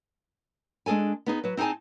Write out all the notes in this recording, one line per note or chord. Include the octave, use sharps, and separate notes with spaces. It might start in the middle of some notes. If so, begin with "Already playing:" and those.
G#3 D4 G#4 A4 G#5
B3 D#4 G#4
F#3 B4
C4 D#4 G#4 G#5 A5